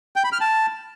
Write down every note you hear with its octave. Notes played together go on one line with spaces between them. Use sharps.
G5
B5
F6
A5